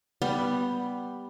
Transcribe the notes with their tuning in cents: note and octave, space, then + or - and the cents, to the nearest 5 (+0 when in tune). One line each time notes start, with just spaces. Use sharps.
G3 +0 B3 +0